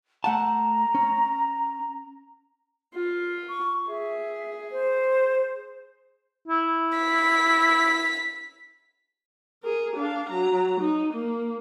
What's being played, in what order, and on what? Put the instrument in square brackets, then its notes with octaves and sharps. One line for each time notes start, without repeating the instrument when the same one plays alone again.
[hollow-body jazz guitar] A3 F#5 A5 [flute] A#5
[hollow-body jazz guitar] C#4
[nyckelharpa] F4
[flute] C#6
[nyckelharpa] G#4 [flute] E5
[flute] C5
[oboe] E4
[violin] B6
[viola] G#4 A#4
D4 F5
F#3 A#5
D#4
A#3